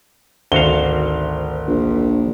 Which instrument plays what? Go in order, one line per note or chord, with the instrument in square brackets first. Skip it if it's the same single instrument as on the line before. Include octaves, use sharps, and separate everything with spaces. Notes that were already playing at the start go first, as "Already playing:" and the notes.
[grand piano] G#1 G7 [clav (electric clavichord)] D2 F#4 F5
[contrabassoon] A#1